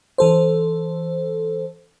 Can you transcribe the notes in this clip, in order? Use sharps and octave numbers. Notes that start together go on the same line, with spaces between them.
E3 A4 C5